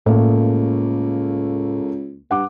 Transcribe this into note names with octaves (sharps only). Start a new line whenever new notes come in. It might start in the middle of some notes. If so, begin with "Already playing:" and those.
C#2 A2 A3 A#3
G2 F#5 D6